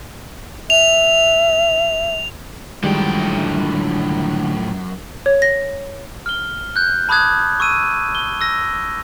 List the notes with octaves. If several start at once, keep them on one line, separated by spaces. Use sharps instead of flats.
E5 F7
F#2 A2 D3 D#3 F3 G3 G#3 G5
C#5
A#6
F6 G7
F#6 G6
A5 B5 D6 D#6 F#6 G#6
C#6 E6 D#7
G7
E6 A#6